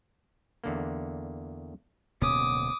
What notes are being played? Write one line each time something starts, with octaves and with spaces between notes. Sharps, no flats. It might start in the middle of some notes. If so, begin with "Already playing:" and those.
E2 D3 A#3
D1 B2 A#3 C#4 D6 D#6